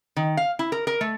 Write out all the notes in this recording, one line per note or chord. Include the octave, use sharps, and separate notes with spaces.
D#3
F5
E4
A#4
A#4
A3